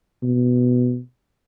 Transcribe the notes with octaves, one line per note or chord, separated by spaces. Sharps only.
B2